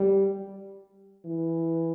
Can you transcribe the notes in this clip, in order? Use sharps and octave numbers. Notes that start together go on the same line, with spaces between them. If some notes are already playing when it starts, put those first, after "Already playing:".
Already playing: G3
E3